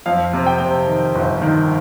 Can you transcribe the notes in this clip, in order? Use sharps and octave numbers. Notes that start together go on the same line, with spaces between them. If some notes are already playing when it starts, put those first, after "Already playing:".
F2 F5
C3
G5
C3
D#3
G1
D#3